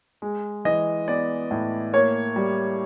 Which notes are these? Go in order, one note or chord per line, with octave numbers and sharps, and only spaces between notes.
G#3
E3 D#5
B3 D5
A2
A#3 C#5
G3